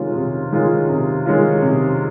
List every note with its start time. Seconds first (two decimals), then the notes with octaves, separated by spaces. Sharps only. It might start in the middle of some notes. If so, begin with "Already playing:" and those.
Already playing: C3 D#3 G#3 C#4 F4
0.16 C3
0.52 D#3 G#3 C#4 F4
0.89 C3
1.26 D#3 G#3 C#4 F4
1.62 C3